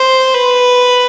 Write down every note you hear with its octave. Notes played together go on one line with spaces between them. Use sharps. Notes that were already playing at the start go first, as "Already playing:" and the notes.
Already playing: C5
B4